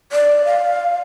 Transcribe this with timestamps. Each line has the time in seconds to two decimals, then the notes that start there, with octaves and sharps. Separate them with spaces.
0.12 D5
0.45 F5